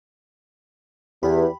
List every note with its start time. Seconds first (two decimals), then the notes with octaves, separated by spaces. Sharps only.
1.23 E2 G4 B5